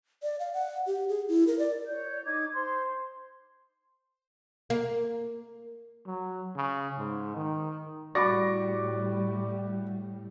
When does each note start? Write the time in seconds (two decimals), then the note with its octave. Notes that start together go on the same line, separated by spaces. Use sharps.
0.23 D5
0.40 F5
0.54 F#5
0.87 G4
1.09 G#4
1.29 E4
1.47 A#4
1.59 D5
1.87 C#5 D5 G6
2.25 D#4 D6 G#6
2.54 C5 C6
4.70 A#3
6.07 F#3
6.56 C#3
6.98 G#2
7.36 D#3
8.15 A2 G3 F#4 D5 B5 C#6 D6 A#6